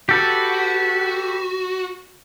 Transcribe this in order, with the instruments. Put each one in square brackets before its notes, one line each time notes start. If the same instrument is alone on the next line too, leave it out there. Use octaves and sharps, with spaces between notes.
[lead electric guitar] F#4 [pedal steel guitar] G4 A4 B4